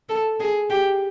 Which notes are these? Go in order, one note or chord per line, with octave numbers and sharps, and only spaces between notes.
A4
G#4
G4